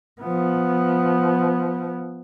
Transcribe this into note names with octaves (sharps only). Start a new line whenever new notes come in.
F3 B3